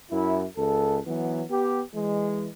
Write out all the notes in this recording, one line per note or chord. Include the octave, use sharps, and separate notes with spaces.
F#2 E4
C#2 A4
E3 F#3 B3
B3 G4
E3 G#3